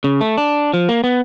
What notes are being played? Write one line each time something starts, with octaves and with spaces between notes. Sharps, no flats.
C#3
A3
D4
F3
A#3
B3